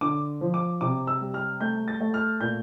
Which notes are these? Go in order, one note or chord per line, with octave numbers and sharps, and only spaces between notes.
D3 D6
F3
D6
C3 D6
E6
G3
F6
A3 G6
A6
A3
F6
A#2 G6